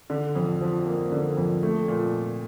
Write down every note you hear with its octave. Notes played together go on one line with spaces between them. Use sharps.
D3
F2
F3
A#3
D3
F2
A3
A#2